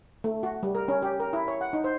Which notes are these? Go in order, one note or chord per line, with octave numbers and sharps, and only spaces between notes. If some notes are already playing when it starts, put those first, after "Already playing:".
A3
F#4
G3
A#4
C#4
G4
A#4
E4
C#5
F#5
D#4
C5